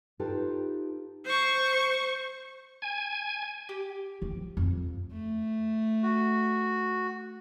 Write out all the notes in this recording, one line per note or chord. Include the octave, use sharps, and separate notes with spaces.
D#4 F4 G4 A4 B4 C5
C5 C#6
G#5
G4
F3
F2
A3
F#4